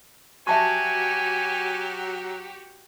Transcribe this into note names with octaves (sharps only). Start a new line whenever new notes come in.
F#3 F#4 G4 E5 G#5 A5 C#6